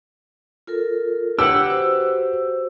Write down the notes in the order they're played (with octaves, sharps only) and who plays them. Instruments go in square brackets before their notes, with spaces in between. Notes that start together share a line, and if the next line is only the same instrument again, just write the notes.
[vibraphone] F4 A4 A#4
[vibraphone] D4 C#5 G5 [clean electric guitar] G4 B4 F#5 [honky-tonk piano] E6
[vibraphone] F#4 C5